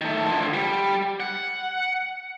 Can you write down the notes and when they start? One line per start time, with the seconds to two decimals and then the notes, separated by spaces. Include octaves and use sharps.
0.01 D#3 A3
0.28 D3 F3
0.54 G3
1.20 F#5